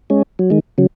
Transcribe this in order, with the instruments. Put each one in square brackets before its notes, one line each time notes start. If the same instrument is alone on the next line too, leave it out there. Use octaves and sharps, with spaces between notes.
[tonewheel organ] G#3 C#4
F#3
D#3 G#3
C#3 F#3